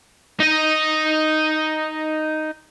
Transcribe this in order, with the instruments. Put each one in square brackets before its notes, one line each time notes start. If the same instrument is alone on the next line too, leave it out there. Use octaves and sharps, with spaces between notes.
[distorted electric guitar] D#4 D#5